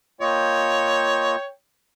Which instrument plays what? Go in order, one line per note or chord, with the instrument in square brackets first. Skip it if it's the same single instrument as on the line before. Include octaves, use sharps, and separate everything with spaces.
[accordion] A#3 F4 D#5 [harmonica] C#5 G5